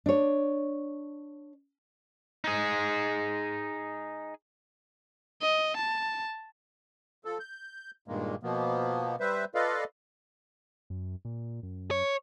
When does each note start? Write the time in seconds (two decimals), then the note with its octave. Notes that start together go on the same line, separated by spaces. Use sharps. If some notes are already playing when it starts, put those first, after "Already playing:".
0.06 D4 C#5
2.44 D#4 G#4
5.42 D#5
5.77 A5
7.25 F3 A4
7.40 G6
8.08 G2 A#2 D#3 G#3 A#3
8.43 B2 F3 A#3 B3
9.20 G3 B4 C5 E5
9.55 F4 A4 B4 D5 D#5 F5
10.90 F#2
11.25 A#2
11.63 F#2
11.91 C#5